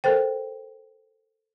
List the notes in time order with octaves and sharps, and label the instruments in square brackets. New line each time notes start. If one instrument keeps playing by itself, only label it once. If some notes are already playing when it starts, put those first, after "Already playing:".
[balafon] A4 A#4 C5 G5